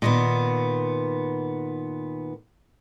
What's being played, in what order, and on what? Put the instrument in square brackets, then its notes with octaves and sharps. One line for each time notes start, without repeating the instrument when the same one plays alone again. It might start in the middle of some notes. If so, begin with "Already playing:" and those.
[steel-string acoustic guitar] A#2 D#3 B3